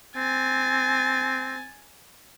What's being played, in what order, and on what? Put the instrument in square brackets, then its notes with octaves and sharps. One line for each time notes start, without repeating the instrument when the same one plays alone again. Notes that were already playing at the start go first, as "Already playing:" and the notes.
[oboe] C4 [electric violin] G#5 A6